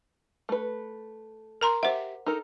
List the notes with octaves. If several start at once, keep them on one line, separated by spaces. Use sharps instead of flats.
A3 B4
A#4 A#5 C6
G4 C5 E5 F#5
D#4 A4 A#4